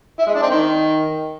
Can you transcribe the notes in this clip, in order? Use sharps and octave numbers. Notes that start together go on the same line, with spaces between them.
E4
G#3
D4
C4
D#3